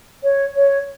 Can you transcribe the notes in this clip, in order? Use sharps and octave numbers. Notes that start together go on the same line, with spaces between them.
C#5
C#5